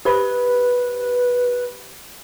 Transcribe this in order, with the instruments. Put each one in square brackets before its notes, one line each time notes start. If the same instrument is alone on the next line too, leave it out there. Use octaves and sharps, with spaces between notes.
[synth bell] G4 C5 B5 [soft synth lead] B4